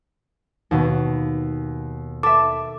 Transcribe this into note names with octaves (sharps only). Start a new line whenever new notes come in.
D#2 B2
A4 E5 D6